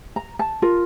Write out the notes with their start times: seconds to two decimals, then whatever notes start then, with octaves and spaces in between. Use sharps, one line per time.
0.16 A#5
0.39 A5
0.62 F4 A#4